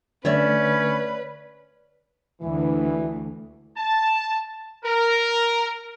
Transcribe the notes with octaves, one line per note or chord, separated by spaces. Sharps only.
D3 A3 C#4 B4 C#5 D5 E5
D2 E3
A5
A#4